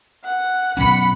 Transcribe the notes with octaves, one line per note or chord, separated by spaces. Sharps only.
F#5
B2 F#3 C#4 B5 C#7